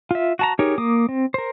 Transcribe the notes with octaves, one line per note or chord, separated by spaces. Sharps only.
F4 E5
F#4 A5 A#5
D#4 G4 G#4 A#4 C#5
A#3 D6 D#6
C4
A#4 C5